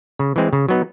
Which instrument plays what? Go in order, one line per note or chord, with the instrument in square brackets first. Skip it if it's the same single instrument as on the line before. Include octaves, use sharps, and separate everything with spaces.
[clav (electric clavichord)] C#3
E3 G#3 C4
C#3
F#3 B3 D#4